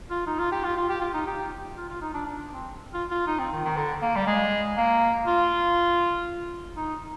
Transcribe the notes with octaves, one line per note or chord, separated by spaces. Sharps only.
F4
D#4
F4
G4
F4
F4
G4
F4
D#4
G4
F4
F4
D#4
D4
D4
C4
F4
F4
D#4
C4
D#3
D#3
D3
A#3
G3
G#3
A#3
F4
D#4